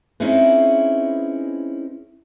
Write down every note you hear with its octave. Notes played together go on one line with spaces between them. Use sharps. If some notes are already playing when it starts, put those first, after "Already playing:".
C4 C#4 D#4 E4 G#4 B4